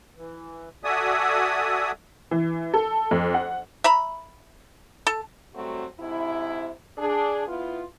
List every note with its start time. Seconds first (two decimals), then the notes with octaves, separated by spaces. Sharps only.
0.17 E3
0.84 F#4 A4 D5 E5 G#5 D#6
2.31 E3
2.74 A4
3.11 F2
3.34 F#5
3.84 E5 A#5 B5
5.07 A4
5.54 F#3 G3 A3 C4 F#4
5.99 G#2 C3 E4
6.98 D4 G#4
7.46 B3 E4 F4